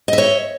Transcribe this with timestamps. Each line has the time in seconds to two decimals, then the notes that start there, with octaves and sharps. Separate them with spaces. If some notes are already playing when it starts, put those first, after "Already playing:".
0.08 D#5
0.13 E5
0.18 C#5